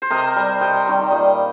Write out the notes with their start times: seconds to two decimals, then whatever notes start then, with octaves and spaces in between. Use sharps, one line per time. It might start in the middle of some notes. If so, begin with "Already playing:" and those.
0.02 C5
0.10 C3 A#4 D#5
0.36 G3
0.61 C3 D#5 G5
0.87 D#3 G3
1.11 A#2 D#5 G5